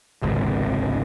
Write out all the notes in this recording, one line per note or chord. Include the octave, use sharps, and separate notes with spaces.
D#1 G#1 C#2 C3